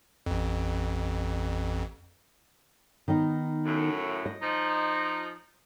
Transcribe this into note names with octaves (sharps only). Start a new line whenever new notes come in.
A1 F2
D#3 B3 D#4
F#2 A2
D#5
F3 D#4